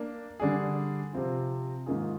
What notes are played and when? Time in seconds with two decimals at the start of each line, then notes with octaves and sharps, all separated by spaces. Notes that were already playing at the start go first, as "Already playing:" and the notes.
Already playing: A#3 D4
0.40 D3 G3 D4 G#4
1.13 C3 F3 C4 F4
1.86 G#2 D#3 A#3 F4 G#4